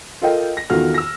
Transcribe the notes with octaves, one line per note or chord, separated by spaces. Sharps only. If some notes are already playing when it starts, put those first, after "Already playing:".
F4 A4 A#4 D#5 G5
A#6
E2 D#3 F4 F#4 A4 F6
E6 A#6